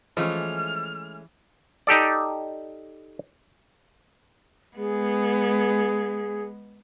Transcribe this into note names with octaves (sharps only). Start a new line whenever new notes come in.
E3 F3 G#3 A3 C#4 F6
D#4 G4 A4 D5
G#3 B3 G#4